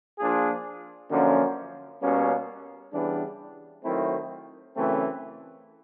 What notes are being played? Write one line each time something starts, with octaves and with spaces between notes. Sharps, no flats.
F3 A#3 D4 F4 G#4
F#2 D3 F3 A#3 C#4
B2 G3 A#3 C#4
C#3 E3 G3 B3 D4
D#3 F#3 A3 C4 E4
F#2 C#3 E3 A3 C4